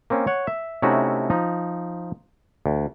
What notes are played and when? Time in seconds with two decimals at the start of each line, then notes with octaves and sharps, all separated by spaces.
0.10 A#3 C4 C#4
0.27 C#5 F#5
0.47 E5
0.82 C3 A3 C#4 D#4 E4 F#4
1.30 F3 D#4
2.66 D2